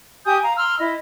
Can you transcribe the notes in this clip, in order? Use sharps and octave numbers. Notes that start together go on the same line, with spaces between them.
G4 G#5 D#6 G6
F5 A#5
A#5 C6 E6 F6
E4 D#5